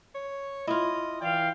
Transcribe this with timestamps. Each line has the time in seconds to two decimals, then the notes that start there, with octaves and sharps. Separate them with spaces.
0.14 C#5
0.67 E4 F4 D#5
1.22 E3 D5 F5 G5